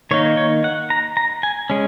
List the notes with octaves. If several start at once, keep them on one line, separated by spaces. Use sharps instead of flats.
D#3 A#3 D#4 C#5
C#5
F#5
A#5
A#5
G#5
G#3 C#4